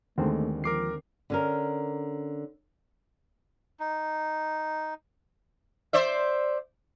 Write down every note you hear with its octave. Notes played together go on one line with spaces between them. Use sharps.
D#2 D3 D#3 G#3 A3 C4
F3 A#4 D6 C7
D3 C#4 A#4
D#4
C5 D5 E5